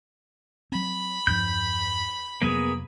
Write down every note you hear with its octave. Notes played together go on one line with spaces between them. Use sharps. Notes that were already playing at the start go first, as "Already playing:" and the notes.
F#3 C4 B5
E2 G2 F3 G6
F2 C3 F#3 A#3 B3 G#4